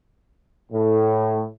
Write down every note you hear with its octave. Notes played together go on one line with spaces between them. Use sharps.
A2